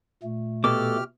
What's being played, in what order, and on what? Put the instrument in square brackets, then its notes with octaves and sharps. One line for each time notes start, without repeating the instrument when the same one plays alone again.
[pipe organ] A#2 A3
[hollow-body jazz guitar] B2 [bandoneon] G4 F6 [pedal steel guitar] A4 D6